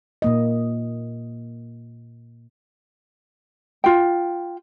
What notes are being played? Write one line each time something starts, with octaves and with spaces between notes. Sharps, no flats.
A#2 A#3 D#5
F4 G5